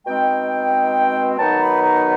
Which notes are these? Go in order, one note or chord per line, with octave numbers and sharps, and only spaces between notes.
B2 G#3 C4 D#4 G5
D#3 F#3 B3 D#4 A5
B5
A#5